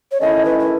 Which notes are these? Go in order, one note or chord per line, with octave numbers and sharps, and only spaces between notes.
C#5
D#3 A3 C#4 E4 D#5
B4
B4